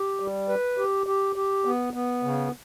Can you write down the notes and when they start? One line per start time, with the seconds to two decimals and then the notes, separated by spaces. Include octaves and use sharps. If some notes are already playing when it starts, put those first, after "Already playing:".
Already playing: G4
0.20 G3
0.49 B4
0.78 G4
1.07 G4
1.36 G4
1.65 B3
1.94 B3
2.23 C#3